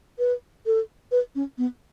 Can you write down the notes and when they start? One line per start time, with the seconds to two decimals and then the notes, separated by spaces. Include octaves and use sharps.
0.19 B4
0.66 A4
1.12 B4
1.35 C#4
1.58 B3